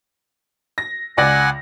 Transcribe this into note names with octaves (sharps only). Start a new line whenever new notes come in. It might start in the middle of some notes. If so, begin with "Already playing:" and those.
A#6
C#2 D5 F#5 G#5 A#6